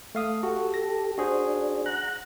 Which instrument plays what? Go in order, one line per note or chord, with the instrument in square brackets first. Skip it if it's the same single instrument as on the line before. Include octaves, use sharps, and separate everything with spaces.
[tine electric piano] A3 F5 D#6
[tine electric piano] F#4 [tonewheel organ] G4 A4
[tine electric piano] A#6
[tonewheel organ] D4 [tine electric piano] F#4 G#4 C5
[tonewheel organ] F#5 A#5 F#6